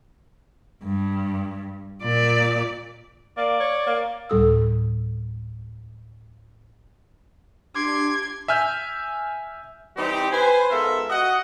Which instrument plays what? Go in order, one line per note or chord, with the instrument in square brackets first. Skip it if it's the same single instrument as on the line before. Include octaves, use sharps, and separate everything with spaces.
[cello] G2
A#2 D5
[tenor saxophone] A#3 [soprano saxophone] D5
[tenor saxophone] C#5
A#3
[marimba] D2 A2 G3 A4 D#6 E6
[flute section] D4 G4 [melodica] C6 D6 [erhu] G#6
[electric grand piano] E5 G#5 F6 G6
[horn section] E3 G3 C4 D#4 G4
B4 C5 G#5
G#2 B3 F4 A4 A#4 E5
F#4 D#5 F#5